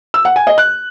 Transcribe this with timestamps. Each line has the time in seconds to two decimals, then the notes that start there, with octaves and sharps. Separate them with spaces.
0.14 E6
0.25 F#5
0.36 G#5
0.47 D#5
0.58 F#6